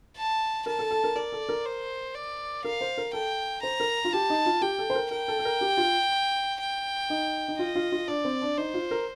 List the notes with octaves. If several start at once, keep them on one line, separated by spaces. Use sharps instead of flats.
A5
A#4 A5
A4
A4
A#4
A#4 D5
A4
A#4
C5
D5
A#4 F5
C5
A#4
A4 G5
C5 A#5
A#4
F4
G4 A5
D#4
F4
G4 G5
A4
C5
A#4
A#4 G5
A4
A4
A#4
G4
F4
G5
D#4
D#4
F4 D#5
F4
F4
D4 D5
C4
D4
D#4 C5
F4
A#4